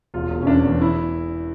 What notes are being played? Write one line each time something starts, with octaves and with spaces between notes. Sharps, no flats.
E1 F4
E1
C#4
E2 D4
E2
E3 E4